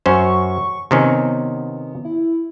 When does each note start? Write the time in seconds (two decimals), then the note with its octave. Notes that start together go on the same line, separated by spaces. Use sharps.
0.06 F#2 C#4 C5 C#6
0.91 C3 D#3 B3 C#4
2.05 E4